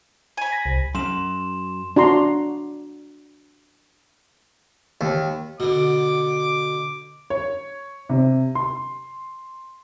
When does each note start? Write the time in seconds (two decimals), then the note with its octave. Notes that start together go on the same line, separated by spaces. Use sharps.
0.37 G#5 B5
0.52 A#6
0.66 C2
0.95 F#2 C6 E7
1.96 D4 F#4 A#5 C6
5.01 D#2
5.60 B2 D3 D6
7.30 C#5
8.09 C3
8.55 C6